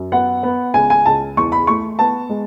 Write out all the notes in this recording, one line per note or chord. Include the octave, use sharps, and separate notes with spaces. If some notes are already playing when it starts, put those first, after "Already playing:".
Already playing: F#2
B3 F#5
B3
C#2 G#5
G#5
C#2 A5
E2 C#6
B5
A3 C#6
B3 A5
G#3